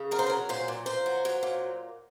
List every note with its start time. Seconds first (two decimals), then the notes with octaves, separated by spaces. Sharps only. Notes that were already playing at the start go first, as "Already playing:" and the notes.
Already playing: C#3
0.11 F#3 A#4
0.19 C5
0.27 A#4
0.30 F#3
0.49 A#2 C5
0.68 A#2
0.86 A#2 C5
1.06 F#3
1.25 F#3
1.43 A#2